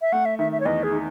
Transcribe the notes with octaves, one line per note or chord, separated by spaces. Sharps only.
E5
A3 F#5
E5
D#3 E5
E5
C#5
E2 D#5
G#4
D#4